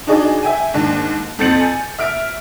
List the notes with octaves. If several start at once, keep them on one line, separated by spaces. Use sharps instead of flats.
D4 D#4 F#4 G#4 D5 D#5
E5 G5 G#5
D#2 G#2 D4
F2 C4 G6 A6 C#7 F#7
G#5
E5 F6 D7